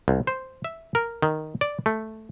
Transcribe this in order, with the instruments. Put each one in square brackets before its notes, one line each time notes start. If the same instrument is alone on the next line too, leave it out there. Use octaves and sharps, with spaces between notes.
[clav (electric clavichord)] C2
C5
E5
A#4
D#3
D5
A3